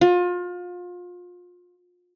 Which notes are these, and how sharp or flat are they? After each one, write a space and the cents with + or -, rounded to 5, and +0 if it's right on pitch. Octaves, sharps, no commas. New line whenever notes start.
F4 +30